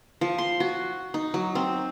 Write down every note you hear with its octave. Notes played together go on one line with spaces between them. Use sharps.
F3
C6
F#4
D#4
F#3
C4